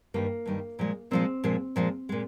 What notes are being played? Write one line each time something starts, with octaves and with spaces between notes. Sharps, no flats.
G2 D#3 G3 A#3
G2 D#3 G3
A#2 F3 G#3
A#2 F3 G#3 C4
A#2 F3 G#3
A#2 F3 G#3
A#2 G#3